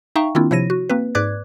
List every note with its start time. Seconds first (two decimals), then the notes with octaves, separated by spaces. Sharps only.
0.16 D#4 E5 F5 G5 A#5 C#6
0.35 D#3 A#3 C4 D4 E4 F4
0.51 C3 F3 E4 C#5 A#6 D#7
0.70 F#4
0.90 A#3 C4 B4
1.15 G#2 B4 D5 D6 F#6 G#6